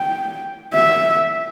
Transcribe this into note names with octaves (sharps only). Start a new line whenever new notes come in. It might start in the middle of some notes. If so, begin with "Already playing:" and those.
Already playing: G5
E5